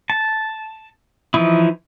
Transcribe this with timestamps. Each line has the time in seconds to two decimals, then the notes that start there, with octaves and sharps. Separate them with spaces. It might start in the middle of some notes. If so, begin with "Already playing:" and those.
0.10 A5
1.34 E3 F3 D#4 E4